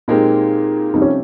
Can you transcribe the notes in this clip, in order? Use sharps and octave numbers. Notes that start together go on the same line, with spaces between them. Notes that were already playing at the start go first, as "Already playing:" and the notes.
A#2 G#3 C4 D#4 G4 A#4
F2 C3 G3 C4 D#4
C#4